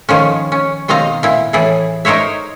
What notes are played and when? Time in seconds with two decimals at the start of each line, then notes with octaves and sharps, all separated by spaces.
0.09 D#3 F3 C#4
0.52 C#4
0.88 B2 D#3 C4 D#5 F5 A#5
1.23 A#2 E4
1.53 A2 E3 E4 G#4 A4
2.05 D#4 A#4 C5 C#5 E5